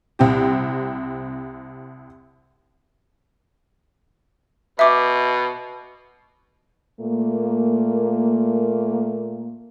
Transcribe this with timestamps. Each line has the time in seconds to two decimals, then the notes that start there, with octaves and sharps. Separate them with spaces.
0.19 C2 C4 G4
4.79 B2 E5 D6
7.01 A#2 A3 A#3